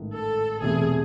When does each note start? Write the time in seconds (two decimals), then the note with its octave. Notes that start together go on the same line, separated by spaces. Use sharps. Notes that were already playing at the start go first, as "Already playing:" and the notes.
Already playing: A1 G#2 D#3 A3
0.14 A4
0.61 E1 E2 C3 E3 A3 G#4